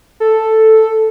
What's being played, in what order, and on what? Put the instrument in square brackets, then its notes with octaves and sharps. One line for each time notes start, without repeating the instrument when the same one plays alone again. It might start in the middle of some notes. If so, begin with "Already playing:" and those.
[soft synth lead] A4